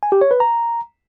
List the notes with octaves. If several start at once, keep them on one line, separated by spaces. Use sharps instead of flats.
G#5
G4
C#5
B4
A#5